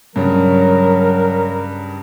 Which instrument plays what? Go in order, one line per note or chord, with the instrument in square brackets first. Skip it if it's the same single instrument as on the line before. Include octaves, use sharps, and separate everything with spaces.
[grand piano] G2 C#3 [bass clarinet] F#3 [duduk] A#4